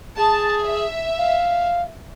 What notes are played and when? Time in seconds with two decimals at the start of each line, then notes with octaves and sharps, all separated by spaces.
0.17 G#4 A5
0.65 E5
1.18 F5